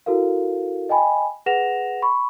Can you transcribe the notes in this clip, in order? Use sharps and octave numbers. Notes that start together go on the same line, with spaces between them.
E4 F#4 A4 A#4 F5
D#5 G5 G#5 B5
G#4 B4 F#5 A#6 E7 F7
B5 C#6